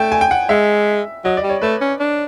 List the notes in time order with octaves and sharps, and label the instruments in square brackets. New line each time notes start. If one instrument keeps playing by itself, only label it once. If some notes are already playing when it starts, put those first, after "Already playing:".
Already playing: [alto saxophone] A3 [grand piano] G5
[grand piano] G#5
G5
F#5
[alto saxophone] G#3 [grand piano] E5
[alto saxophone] F#3 [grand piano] D#5
[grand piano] D5
[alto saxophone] G3
[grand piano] C#5
[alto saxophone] A3 [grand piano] B4
[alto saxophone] C#4
D4